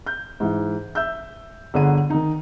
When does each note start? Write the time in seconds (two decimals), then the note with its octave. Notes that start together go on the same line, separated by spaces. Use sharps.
0.07 G6
0.40 G#2 E3
0.95 E5 E6 G6
1.74 G1 D3 G#4 F#5 D#7
2.10 D#3 D#4